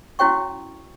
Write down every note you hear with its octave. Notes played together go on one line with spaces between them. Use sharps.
C#4 E4 F#4 C#5 G5 C#6